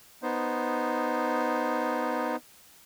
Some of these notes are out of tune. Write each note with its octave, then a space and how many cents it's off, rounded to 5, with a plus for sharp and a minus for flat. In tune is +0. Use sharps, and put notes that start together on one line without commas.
B3 +0 D#4 -5 C5 +0